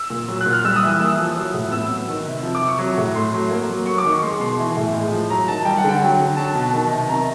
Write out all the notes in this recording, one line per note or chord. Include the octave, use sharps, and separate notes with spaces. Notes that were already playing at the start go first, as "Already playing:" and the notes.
Already playing: E6
A#2
F#3
F#6
A#2
F6
G3 E6
D#6
E3
D#6
A#3 E6
F3
F#3
A2
B3 E6
F#3
D#3
C3
F3
D6
C3
C#6
F#3
A2
A3 C6
F#3
A#3
F#3
F#3 C#6
D6
D#3
C#6
G#3 C6
B2 C6
E3
A2
G#3
F3
F#3 A#5
D#3 A5
G3 G5
F#5
D3 G5
F#3
D3
F#3 A5
B2
D#3
C3
D#3 A#5